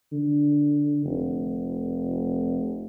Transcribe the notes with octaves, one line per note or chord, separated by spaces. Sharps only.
D3
F1